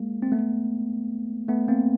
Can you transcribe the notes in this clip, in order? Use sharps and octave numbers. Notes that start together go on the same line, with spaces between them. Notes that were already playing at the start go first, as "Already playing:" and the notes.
Already playing: G#3 A#3
C4
A3 B3
A3 B3
A#3 C4